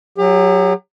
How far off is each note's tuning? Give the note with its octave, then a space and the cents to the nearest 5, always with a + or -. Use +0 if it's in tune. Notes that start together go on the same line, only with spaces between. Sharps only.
F#3 +0 G4 +40